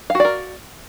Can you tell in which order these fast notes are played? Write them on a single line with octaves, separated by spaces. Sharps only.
F5 F#4 D5 A#4